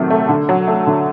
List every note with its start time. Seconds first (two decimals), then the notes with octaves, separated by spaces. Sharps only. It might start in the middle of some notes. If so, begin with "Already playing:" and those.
Already playing: C3 D#3 F#3 A3
0.10 A3
0.29 D3
0.49 F#3
0.68 A3
0.87 D3